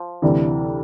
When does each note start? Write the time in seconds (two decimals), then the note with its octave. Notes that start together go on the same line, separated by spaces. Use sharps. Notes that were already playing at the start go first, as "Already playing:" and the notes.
Already playing: F3
0.22 D2 C3 E3 G3